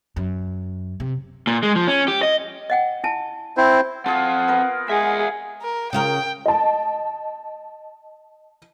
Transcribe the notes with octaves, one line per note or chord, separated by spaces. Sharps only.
F#2
C3
A#2
G#3
F3
C#4
G4
D#5
D#5 F#5 G5
E4 G#5 A5
C4 E4 C5
C4 F4 G#4 A4 F5 F#5
B3 A#4
G#3 G#4 E5 F#5
A#4
C#3 F4 A#4 G5
D#5 A5